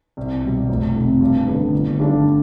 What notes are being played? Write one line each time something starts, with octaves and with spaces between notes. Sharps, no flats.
C2
B2 G3
F1
F2 C3
G2
D3 G3 B3
G1
G2 D3 G3 D4